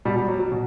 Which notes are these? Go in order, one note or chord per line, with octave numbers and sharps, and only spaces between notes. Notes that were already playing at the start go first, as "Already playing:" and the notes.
B2 G3
G3
F#3
F#3
B2